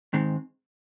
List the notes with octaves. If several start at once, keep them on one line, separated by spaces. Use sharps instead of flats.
G#2 D#3 G#3 C4